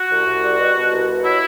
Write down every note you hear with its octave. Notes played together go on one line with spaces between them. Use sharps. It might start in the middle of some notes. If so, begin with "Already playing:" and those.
Already playing: F#4
C2
C2
G3
B2
B2
C2
B2
F#3 E4